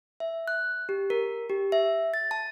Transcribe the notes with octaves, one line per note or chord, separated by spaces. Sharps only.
E5
F#6
G4
A#4
G4
E5
A6
A5